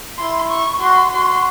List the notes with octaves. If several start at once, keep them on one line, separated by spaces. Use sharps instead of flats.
E4 C6
C#6
F#4 C6
F#4 C6